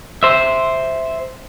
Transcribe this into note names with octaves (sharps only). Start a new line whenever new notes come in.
C5 E5